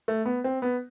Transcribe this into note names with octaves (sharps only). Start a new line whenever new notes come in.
A3
B3
C4
B3